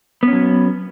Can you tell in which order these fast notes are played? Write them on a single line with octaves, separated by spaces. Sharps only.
B3 C#4 F#3